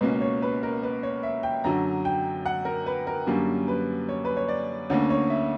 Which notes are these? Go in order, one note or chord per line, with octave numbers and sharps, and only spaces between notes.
C#2 B2 A#3 C#4 B4
C#5
B4
A#4
B4
C#5
E5
G5
F#2 D3 F#3 A#5
G5
F#5
A#4
B4
A#4
F#2 D3 G3 A#3 C#4
B4
C#5
B4
C#5
D5
D2 D3 A#3 C#4 C#5
C#5
E5